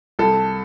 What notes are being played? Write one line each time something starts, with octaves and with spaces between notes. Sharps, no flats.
C2 A4